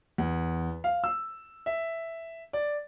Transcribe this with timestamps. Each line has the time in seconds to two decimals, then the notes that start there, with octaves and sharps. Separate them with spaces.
0.18 E2
0.84 F5
1.04 E6
1.66 E5
2.53 D5